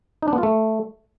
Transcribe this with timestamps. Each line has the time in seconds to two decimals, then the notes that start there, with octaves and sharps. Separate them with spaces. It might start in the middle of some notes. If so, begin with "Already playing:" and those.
0.22 D#4
0.28 D4
0.33 B3
0.38 F4
0.43 A3